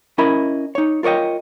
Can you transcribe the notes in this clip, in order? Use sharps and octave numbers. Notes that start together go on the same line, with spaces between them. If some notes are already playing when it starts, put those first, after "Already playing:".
C#4 E4 A#4 D#5 B5
D#4 C#5
F4 A#4 C#5 D#5 G5